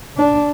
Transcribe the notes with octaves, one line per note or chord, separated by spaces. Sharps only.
D4